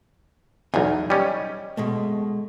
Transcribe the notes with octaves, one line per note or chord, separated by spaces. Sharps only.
B1 E2 D#4 G#5
G3 C#4 D#5
B2 G#3 A3